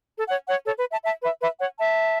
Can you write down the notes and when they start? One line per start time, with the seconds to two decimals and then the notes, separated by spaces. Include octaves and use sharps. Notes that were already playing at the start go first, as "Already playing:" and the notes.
0.17 A4
0.29 C#5 F#5
0.48 C#5 F#5
0.66 A4 C#5
0.79 B4
0.91 E5 A5
1.04 E5 A5
1.22 B4 E5
1.41 B4 E5
1.60 C#5 F#5
1.78 E5 A5